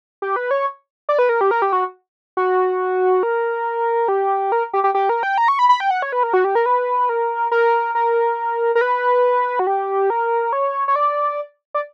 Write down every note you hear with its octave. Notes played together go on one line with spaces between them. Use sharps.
G4
B4
C#5
D5
B4
A#4
G4
A#4
G4
F#4
F#4
A#4
G4
A#4
G4
G4
G4
A#4
G5
A#5
C#6
B5
B5
G5
F#5
C#5
B4
A#4
F#4
G4
A#4
B4
A#4
A#4
A#4
A#4
B4
F#4
G4
A#4
C#5
C#5
D5
D5